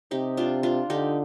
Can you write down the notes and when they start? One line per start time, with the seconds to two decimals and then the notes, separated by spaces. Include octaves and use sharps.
0.11 C3 D#4 G4
0.37 D4 F4
0.63 D4 F4
0.89 D3 D#4 G4